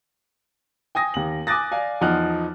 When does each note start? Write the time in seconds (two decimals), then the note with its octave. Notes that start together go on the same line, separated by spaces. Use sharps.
0.95 G5 G#5 D#6 A#6
1.14 D#2 F#7
1.47 G#5 D6 D#6 F#6 A6 A#6
1.72 D5 F5 G#5
2.01 E2 F3 D#4 F#5 F6 F#6